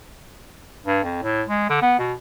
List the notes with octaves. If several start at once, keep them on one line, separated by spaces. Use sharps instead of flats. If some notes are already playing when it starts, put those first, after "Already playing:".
G2
F2
A2
G#3
D3
B3
B2